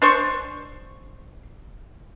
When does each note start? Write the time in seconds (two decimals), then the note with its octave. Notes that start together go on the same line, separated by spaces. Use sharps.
0.02 D4 C5 C#6